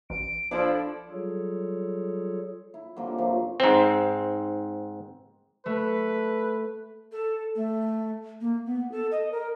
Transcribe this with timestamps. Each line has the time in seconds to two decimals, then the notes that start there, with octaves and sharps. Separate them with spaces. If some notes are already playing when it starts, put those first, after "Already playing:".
0.10 A1 D7
0.51 F3 D4 E4 A4
1.10 F#3 G3 F4 G#4 A4 C#5
2.74 E4
2.96 D3 G3 A#3 C4
3.18 F#2 C3 F3
3.60 G#2 C4
5.66 A3 B4
7.12 A4
7.55 A3
8.41 A#3
8.66 B3
8.92 A4
9.12 D#5
9.32 A#4